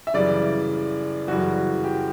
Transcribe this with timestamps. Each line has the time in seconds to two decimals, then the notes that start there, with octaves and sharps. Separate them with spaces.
0.07 E5
0.14 F#2 C#3 E3 G3 D5
1.28 F#2 C#3 E3 G3 F#4
1.84 G4